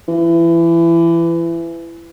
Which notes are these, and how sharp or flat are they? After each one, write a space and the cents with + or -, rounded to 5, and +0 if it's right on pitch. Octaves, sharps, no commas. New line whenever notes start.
E3 +25